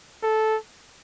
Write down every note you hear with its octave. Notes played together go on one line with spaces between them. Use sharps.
A4